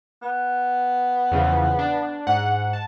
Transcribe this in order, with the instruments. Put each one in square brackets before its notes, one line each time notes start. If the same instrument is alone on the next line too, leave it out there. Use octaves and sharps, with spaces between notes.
[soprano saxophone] B3
[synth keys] E2 C#3 F3
D4
G#2 F#5
A5